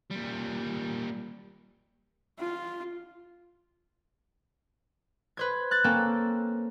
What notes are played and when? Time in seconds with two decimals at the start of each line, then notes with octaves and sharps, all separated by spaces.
0.11 A#2 G3
2.39 F4
5.37 B4 C5 G#6
5.71 F#6 A6
5.84 A#3 C4 C#4 A4